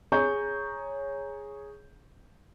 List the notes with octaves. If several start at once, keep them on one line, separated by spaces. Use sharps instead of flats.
G#4 C#5 A#5 C#6 G6